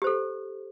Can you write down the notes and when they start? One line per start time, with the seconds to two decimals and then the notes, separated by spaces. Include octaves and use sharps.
0.02 G4
0.04 C5
0.07 A4